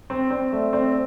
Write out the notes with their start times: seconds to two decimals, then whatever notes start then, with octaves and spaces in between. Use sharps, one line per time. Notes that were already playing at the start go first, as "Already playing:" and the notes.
0.10 C4
0.30 C4 D5
0.52 A3
0.73 C4 D5
0.87 C5